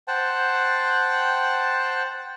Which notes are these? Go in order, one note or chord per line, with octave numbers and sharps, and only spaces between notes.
C5 F#5 G5 A5